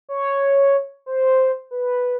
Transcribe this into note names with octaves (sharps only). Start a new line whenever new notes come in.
C#5
C5
B4